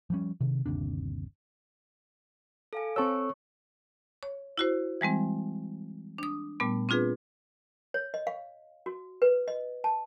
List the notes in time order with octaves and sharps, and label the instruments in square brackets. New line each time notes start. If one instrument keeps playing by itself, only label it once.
[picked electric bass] F3 G3 C#4
C3 D#3
G1 D#2 C3 D4
[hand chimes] A4 F5 G#5
[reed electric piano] C4 A4 E6 [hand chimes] C#5 C#6
[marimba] C#5
E4 F#4 C5
E3 G3 G#3 C4
D4 D#6
A#2 G3 A3 B3
C4 D4 F4 G#4 B4
[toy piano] C#5
D#5
F5
F#4
B4
D#5
A5